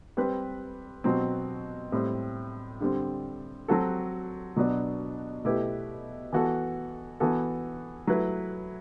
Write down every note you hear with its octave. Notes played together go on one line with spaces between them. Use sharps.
G3 C4 G4 B4
B2 F#3 C4
A2 G3 C4
D3 G3 C4
F#3 C4 F#4 A4
B2 F#3 B3 D4
B2 A3 E4 G4 B4
E3 B3 F#4 A4
E3 B3 F#4 A4
F#3 A3 E4 B4